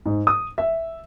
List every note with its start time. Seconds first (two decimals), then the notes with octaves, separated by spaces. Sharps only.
0.06 G#2
0.27 D#6
0.58 E5